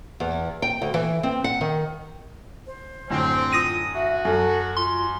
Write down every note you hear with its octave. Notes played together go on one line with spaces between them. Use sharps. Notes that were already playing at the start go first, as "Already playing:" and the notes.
E2
G5
D2
E3
C4
F#5
D#3
C5
F#2 A2 D3 C4
F4 D#6 A#6 D#7
F#4 E5
F#2 A4
F4 C6